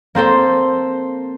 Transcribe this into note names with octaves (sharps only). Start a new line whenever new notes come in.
A#3 C4 A4 C5